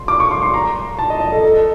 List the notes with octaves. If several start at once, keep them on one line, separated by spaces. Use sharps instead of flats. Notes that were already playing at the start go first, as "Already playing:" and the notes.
Already playing: C6
D6
C#6
C6
C6
A#5
A5
D#5
D#5
A4
A4